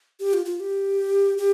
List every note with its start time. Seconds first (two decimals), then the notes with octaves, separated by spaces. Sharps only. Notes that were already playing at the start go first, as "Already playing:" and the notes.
0.20 G4
0.33 F4
0.46 F4
0.60 G4
1.38 G4